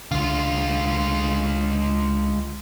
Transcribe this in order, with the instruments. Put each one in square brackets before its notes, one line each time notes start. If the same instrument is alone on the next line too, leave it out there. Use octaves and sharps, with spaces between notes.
[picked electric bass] C#2 D3 [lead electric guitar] G#3 F4